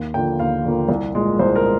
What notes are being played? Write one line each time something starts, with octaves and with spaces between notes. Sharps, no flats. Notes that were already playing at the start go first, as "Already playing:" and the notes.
Already playing: D#2
D3 F3 A#3 G5
D#2 F5
D3 F3 A#3
C2
A#2 G#3
C2 C5
A#4
G#3